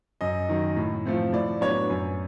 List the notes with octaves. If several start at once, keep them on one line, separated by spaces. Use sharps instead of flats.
F#2 D#5
D#3 F#3
A2
F3 A3 C4
A2 D5
F#3 B3 D4 C#5
F#2